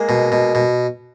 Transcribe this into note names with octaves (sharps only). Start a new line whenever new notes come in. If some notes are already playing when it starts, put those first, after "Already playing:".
Already playing: G#3 A#3
B2
B2
B2